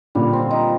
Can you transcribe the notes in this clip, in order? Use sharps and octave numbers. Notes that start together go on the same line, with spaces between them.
A#2 D3 G3
C4
D#4